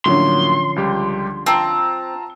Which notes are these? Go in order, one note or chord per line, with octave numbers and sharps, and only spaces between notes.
A2 D3 F3 F#3 A#3 C#4 C6
C#2 G3 G4
C4 F4 A5 A#5